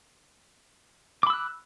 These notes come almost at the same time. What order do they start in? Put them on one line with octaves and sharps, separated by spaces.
D6 B5 E6 F#6